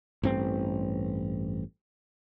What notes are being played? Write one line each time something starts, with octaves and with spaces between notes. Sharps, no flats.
A1 G2 C4